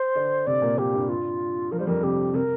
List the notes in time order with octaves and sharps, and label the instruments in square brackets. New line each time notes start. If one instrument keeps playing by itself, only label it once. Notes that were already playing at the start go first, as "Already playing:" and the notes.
Already playing: [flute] C5
[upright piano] D3 D4
[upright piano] C3 C4 [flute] D5
[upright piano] A#2 A#3
[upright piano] A#2 A#3 [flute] G4
[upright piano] G2 G3
[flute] F4
[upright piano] F3 [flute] A#4
[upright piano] G3 [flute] C5
[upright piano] F2 F3 [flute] A#4
[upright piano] C3 [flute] G4
[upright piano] C3 [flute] A#4